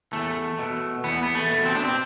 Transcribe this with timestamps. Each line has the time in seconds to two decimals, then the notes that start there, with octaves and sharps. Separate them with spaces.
0.13 E2 A3
0.59 B2
1.04 E2 B3
1.23 B3
1.35 A3
1.50 B2
1.65 C4
1.75 D4
1.84 C4